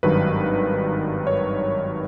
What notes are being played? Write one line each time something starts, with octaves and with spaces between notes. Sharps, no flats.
G#1 G2 D#3 F#3 B4
C#5